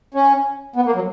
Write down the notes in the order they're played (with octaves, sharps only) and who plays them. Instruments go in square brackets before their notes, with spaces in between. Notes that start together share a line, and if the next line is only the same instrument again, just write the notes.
[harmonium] C#4
B3
A#3
F#3